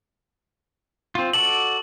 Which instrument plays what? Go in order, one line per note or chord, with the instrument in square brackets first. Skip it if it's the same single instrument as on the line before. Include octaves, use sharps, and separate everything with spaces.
[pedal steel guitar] C4 F4
[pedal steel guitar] F#4 A4 D5 [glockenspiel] F#7